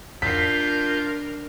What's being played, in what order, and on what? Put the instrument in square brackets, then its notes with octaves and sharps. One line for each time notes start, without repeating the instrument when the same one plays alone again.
[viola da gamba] D4 A#4 [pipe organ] F4 G6 [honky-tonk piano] B6 C7